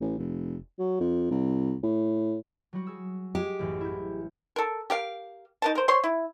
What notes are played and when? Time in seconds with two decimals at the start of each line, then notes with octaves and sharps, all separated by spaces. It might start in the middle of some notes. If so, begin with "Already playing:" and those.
0.01 A1
0.18 F1
0.79 F#3
1.00 F2
1.31 C2
1.83 A2
2.73 F#3 G3 F#4
2.87 G#4 E6
3.35 G#3 G4
3.59 A1 F#2 E3
3.81 E4 G6
4.56 A4 A#4
4.90 G4 A#4 F5
5.62 D#4 A#4 A5
5.75 A#4 C5
5.88 C5 C#5 C6
6.03 E4